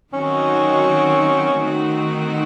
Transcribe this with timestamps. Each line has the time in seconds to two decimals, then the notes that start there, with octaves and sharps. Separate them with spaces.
0.13 D#3 F#3 C4 C#4 D#4 F#4
1.62 D#3 A3 C4 D#4 F#4